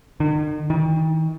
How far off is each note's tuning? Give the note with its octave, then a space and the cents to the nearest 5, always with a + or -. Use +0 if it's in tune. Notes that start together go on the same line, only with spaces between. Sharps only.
D#3 -45
D#3 +40